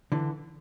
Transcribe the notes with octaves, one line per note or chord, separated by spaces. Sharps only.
D3 E3